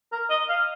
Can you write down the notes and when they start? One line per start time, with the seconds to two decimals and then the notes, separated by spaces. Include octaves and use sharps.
0.12 A#4
0.30 D#5
0.49 F5